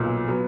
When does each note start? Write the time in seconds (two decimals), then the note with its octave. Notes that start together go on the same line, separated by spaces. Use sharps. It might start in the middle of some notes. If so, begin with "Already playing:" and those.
Already playing: B1 A#2
0.28 F#3 B3